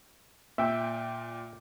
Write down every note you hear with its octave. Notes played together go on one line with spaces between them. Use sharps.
A#2 E5 G5